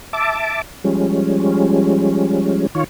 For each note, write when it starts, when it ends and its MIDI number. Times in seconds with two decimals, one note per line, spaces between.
0.13 0.62 76
0.13 0.62 81
0.13 0.62 86
0.84 2.67 53
0.84 2.67 55
0.84 2.67 56
0.84 2.67 61
2.75 2.84 51
2.75 2.84 65
2.75 2.84 73